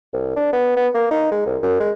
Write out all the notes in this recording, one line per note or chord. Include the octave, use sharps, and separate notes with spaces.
C2
D4
B3
B3
A#3
D#4
G#3
C2
F#2
G#3